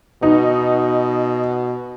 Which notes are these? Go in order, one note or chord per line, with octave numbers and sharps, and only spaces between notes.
B2 D#4